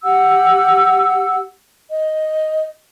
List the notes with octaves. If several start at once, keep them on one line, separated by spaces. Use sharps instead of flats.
G4 F#5 E6
D#5